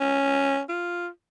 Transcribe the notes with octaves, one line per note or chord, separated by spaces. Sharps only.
C#4
F4